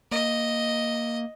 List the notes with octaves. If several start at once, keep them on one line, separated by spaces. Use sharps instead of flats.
A#3 D#5